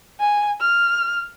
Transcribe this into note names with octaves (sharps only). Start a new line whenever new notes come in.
G#5
F6